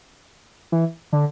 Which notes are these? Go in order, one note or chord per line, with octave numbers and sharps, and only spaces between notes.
E3
D3